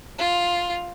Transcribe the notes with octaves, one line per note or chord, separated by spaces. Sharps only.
F4